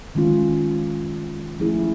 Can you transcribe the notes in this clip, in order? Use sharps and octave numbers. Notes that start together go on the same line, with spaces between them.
D#3 G#3 C#4 F4
F3 A3 C#4 E4 G#4